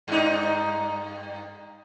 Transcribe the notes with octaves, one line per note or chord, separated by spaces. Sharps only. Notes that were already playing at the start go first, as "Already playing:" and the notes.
G2 D#4